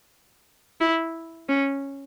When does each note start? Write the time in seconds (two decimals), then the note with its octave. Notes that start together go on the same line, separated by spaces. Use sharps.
0.80 E4
1.49 C#4